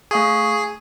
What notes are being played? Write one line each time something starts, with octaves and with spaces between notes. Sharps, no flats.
A3 G#4 F5 C#6